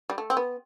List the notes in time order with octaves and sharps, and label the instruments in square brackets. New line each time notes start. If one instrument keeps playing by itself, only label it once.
[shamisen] G3
A3
C4
B3